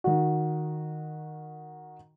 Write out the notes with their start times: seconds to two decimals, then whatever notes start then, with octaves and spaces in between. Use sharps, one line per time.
0.04 D#3 F#4